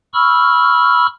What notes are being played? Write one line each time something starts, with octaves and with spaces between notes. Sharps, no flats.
B5 C#6 E6 F6